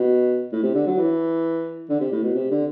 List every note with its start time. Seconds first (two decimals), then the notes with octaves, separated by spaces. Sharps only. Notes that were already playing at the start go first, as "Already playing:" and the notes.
Already playing: B2
0.52 A2
0.63 C3
0.74 D3
0.87 F#3
0.98 E3
1.89 D3
2.00 C3
2.12 A2
2.23 B2
2.35 C3
2.51 D3